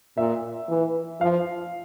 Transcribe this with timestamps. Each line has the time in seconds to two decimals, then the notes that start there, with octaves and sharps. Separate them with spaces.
0.17 A#2 E5
0.69 E3
1.21 F3 F5